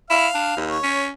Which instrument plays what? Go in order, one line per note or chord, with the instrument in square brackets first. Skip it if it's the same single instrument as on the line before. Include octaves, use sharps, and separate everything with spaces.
[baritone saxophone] E4 [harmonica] F5 F6
[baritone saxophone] D4
D#2
[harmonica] C#5
[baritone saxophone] C#4